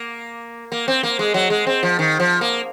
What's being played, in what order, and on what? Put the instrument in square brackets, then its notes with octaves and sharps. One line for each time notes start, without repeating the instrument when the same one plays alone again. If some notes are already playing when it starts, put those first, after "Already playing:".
Already playing: [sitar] A#3
A#3
C4
A#3
G#3
F#3
G#3
C4
F3
D#3
F3
A#3